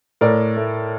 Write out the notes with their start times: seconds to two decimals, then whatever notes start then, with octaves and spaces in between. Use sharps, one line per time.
0.21 A2 A#4 D5
0.56 A3